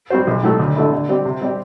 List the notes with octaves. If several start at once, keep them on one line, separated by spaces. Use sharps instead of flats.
G3 C4 F#4 C5
B1
A2 F#3 A3
D2
D3 A3 E4
D3
G3 C4 G4 D5
C3
G3 C4 G4 D5